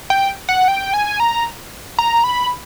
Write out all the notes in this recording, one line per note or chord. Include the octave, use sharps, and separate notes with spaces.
G5
F#5
G5
G#5
A#5
A#5
B5